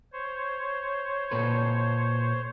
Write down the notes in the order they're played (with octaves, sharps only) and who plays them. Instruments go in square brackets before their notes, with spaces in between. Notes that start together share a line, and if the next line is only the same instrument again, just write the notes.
[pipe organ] C5 C#5
[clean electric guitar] A#2 A4 B4